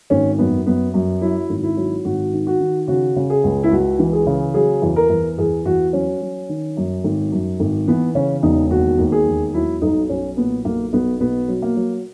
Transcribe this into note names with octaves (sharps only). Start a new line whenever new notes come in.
G#1 C#4
F#2 B3
F#2 B3
F#2
F#3 E4
G#1
E4
F#3
G#1 F#4
D#3
F#4
D#3
C#3 F#4
C#3
G#4
C#2
E4
C#2 F#4
E3
G#4
C#3
F#3 G#4
E2
A#4
E2
E2 G#4
E2 F#4
F#3 C#4
F#3
D#3
F#2
G#1
F#2
G#1
E3 B3
C#3 C#4
E1 D#4
D#2 F#4
D#2
G#4
E1
F#3 E4
B1 D#4
B1 C#4
A#2 B3
B1 A#3
B1 B3
B2 B3
F#3
A#3
F#3